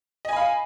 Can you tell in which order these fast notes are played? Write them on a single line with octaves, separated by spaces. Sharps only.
D#5 G#5 B5 F5